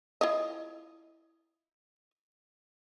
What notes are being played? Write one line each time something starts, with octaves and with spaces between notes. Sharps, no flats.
E4 F4 D#5